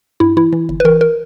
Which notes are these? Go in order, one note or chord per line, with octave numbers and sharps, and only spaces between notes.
G2 E4
E3 E4
E3
G1
B4
E3 A#4
A#4